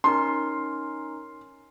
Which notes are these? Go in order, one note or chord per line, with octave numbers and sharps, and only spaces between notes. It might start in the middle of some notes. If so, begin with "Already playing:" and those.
C#4 D#4 A#4 C6